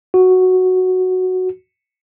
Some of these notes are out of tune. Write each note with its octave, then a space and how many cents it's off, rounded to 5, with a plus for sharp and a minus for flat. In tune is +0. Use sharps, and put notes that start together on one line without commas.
F#4 +0